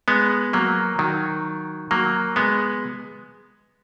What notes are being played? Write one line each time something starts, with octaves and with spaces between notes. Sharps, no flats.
G#3 B3
F#3 A#3
D#3 F#3
F#3 A#3
G#3 B3